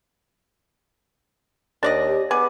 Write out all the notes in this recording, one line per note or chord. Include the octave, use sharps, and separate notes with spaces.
D#2 D4 D5 D#5
G4
B3 G#4 D6